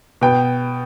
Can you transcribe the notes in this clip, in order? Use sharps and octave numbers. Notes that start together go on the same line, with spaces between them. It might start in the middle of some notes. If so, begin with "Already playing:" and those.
B2 G5